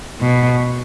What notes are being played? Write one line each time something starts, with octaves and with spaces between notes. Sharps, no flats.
B2